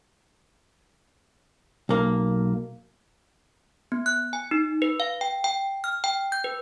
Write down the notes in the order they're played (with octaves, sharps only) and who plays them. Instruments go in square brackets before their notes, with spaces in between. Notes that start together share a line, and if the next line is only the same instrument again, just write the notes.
[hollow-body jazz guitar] B1 A#3
[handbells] B3
F#6
G#5
D#4
B4
F5
G5
G5
F6
G5
G6
B4